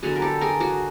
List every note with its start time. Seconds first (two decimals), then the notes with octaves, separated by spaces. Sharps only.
0.03 D3 F#3 B3 F#4 G#4
0.16 A#4
0.22 G4 A4
0.41 G#4 A#4
0.60 F#4 G#4